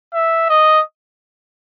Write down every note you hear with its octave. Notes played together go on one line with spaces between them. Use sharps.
E5
D#5